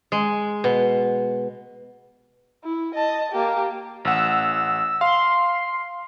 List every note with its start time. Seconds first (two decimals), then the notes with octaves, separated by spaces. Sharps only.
0.12 G#3
0.64 B2
2.64 E4
2.94 D#5 A5
3.32 A#3 G4
4.05 A1 F#5 E6
5.01 F5 C6